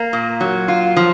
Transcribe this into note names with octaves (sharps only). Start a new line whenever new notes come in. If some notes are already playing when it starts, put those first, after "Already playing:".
Already playing: A#3
A#2
F#3
F4
F3